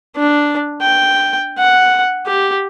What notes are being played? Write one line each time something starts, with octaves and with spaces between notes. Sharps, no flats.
D4
G5
F#5
G4